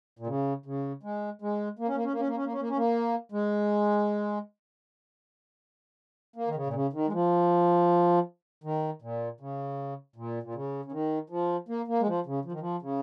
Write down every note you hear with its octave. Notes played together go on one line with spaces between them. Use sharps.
A#2
C#3
C#3
G#3
G#3
A#3
C#4
A#3
C#4
A#3
C#4
A#3
C#4
A#3
C#4
A#3
C#4
A#3
G#3
A#3
D#3
C#3
A#2
C#3
D#3
G#3
F3
D#3
A#2
C#3
A#2
A#2
C#3
C#3
D#3
F3
A#3
A#3
G#3
F3
C#3
F3
D#3
F3
C#3